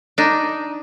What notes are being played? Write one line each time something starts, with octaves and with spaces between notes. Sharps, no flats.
D4 D#4